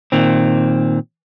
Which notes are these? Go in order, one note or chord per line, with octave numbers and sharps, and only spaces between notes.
A#2 D#3 C4